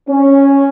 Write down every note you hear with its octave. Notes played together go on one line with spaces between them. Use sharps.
C#4